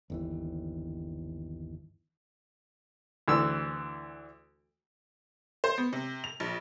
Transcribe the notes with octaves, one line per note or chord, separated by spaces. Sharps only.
G1 D#2 E3
D2 E3 E6
C5
B3
C3
F7
A#1